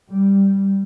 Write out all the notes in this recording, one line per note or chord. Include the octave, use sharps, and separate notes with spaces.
G3